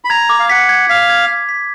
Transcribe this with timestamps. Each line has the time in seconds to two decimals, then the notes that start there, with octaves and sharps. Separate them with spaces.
0.04 B5
0.10 A#5 G#6
0.30 D6
0.39 F5
0.49 F#5 B6
0.69 G#6
0.89 F5 B6
1.10 G#6
1.28 B6
1.49 B6